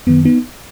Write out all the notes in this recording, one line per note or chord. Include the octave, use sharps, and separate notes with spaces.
F#2 D#3 B3
B3 D#4